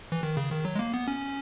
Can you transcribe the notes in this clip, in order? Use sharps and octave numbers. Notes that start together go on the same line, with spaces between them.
E3
D#3
C#3
D#3
F#3
G#3
A#3
B3
C#4